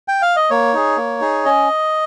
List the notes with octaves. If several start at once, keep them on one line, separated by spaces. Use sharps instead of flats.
G5
F5
D#5
A#3 C#5
D#4 G#4
A#3
D#4 G#4
C#4 D#5